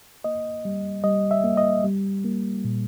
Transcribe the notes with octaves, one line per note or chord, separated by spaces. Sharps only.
A#3 D#5
G3
G3 D#5
E5
A#3
D#5
G3
A#3
A#2